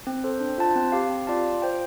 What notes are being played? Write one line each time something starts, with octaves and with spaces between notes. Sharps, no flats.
C4
A4 C5
D4
F4 C5 A5
C4
G4 F5
C4
F4 D5 F5 A5
F4
C5 G5